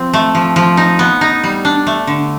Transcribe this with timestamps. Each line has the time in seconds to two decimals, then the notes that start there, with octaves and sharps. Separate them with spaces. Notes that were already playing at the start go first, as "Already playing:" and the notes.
Already playing: F3 C4
0.13 A3
0.35 F3
0.56 F3
0.77 D#4
0.99 B3
1.21 D#4
1.43 G3
1.65 D4
1.87 A3
2.07 D3